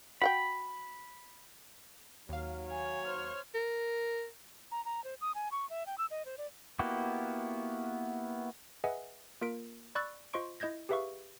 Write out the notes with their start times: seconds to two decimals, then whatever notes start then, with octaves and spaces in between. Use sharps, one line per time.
0.22 F#4 F#5 G5 B5
2.29 D#2 F#3 F5
2.70 C#5 G#5
3.05 C5 F6
3.54 A#4
4.72 A#5
4.85 A#5
5.04 C5
5.21 D#6
5.35 G#5
5.52 C#6
5.70 E5
5.87 G5
5.98 E6
6.11 D#5
6.26 C5
6.38 D5
6.79 A#3 B3 E4 F#4 G4
8.84 G#4 B4 D#5 E5 F#5 G#5
9.41 A#3 F4 A#4 B6 D7
9.95 D5 B5 C#6 E6 F#6 A6
10.33 F4 C5 D#5 C6 C#6 D7
10.60 E4 D#5 G6 G#6 A#6
10.89 G4 G#4 B4 E5 F5 C#6